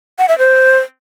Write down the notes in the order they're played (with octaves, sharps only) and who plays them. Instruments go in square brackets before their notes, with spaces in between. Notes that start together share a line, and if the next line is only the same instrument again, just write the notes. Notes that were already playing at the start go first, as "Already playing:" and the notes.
[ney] F#5
E5
C5